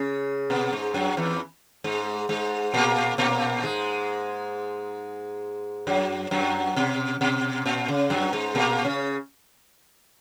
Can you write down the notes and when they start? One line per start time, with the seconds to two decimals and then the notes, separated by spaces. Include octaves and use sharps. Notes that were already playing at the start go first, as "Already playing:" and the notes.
Already playing: C#3 C#4
0.50 B2 B3
0.73 G#2 G#3
0.94 F#2 F#3
1.17 E2 E3
1.84 G#2 G#3
2.29 G#2 G#3
2.74 A#2 A#3
3.18 A#2 A#3
3.63 G#2 G#3
5.87 F#2 F#3
6.31 F#2 F#3
6.76 B2
7.21 B2
7.66 A#2
7.88 C#3
8.10 F#2 F#3
8.33 G#2 G#3
8.55 A#2 A#3
8.84 C#3 C#4